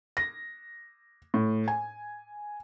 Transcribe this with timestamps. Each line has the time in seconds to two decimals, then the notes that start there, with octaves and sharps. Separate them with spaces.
0.17 A#6
1.34 A2
1.68 G#5